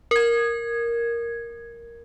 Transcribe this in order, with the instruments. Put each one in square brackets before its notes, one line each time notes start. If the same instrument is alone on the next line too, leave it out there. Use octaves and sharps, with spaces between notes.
[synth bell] A#4 G#6